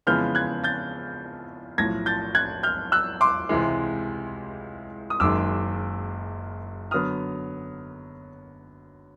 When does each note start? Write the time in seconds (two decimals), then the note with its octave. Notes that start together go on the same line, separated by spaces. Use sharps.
0.07 F2 C#3 E3 G#3 B3 F6 G6
0.35 F#6 G#6
0.64 G6 A6
1.78 B1 A2 F3 G#6 A#6
2.06 G6 A6
2.35 F#6 G#6
2.63 F6 G6
2.92 E6 F#6
3.21 C6 D6
3.49 C#2 C3 E3 G#3
5.10 D#6
5.20 F#1 F#2 D#3 G#3 D6 E6
6.91 D3 F#3 B3 D#6 F6